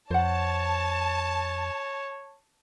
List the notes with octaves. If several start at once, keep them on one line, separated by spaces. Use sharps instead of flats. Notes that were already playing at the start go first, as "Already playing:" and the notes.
F2 C5 C#5 F#5 A5